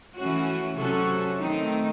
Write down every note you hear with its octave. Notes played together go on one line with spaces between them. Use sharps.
E3 A3 C#4 F#4
C3 F#3 C#4 F#4 A4
D#3 A3 C4 D#4